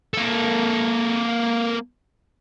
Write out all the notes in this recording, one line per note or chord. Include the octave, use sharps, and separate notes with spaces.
A#3 A4